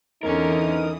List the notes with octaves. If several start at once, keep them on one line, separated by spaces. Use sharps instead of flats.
E2 D3 E3 C#4 D#4 A#4 D#6